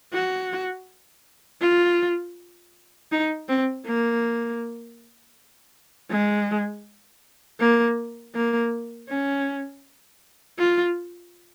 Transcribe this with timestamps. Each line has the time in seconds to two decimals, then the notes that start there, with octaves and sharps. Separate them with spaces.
0.13 F#4
1.61 F4
3.12 D#4
3.49 C4
3.86 A#3
6.11 G#3
7.60 A#3
8.35 A#3
9.09 C#4
10.59 F4